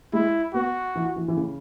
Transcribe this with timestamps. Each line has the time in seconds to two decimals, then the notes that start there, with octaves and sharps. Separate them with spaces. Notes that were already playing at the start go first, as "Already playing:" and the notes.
0.13 G#3 E4
0.54 B3 F#4
0.96 E3
1.16 E3
1.28 E3
1.37 C#3